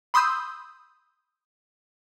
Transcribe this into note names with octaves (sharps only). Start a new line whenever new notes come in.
B5 C6 D#6 E6 G6